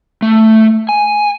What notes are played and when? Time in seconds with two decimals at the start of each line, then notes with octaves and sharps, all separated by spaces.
0.22 A3
0.89 G#5